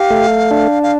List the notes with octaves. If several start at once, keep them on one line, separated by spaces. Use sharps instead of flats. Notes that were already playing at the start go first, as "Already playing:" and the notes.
Already playing: G4 F5
A3
D4
F5